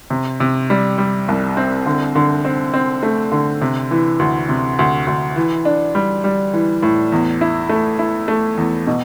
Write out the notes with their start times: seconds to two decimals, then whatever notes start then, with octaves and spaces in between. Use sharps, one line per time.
0.10 C3
0.40 C3
0.70 G3
0.98 G3
1.28 C2
1.57 C4
1.86 D3
2.15 D3
2.45 C4
2.74 C4
3.03 A3
3.32 D3
3.61 C3
3.91 E3
4.19 D2
4.49 C3
4.79 D2
5.07 D2
5.36 E3
5.65 D4
5.95 G3
6.24 G3
6.53 E3
6.83 A2
7.12 E2
7.41 E4
7.69 A3
7.99 E4
8.28 A3
8.57 E2
8.87 B2